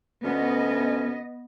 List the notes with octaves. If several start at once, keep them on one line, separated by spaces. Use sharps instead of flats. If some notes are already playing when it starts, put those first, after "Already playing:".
D2 B3 C#4 D#5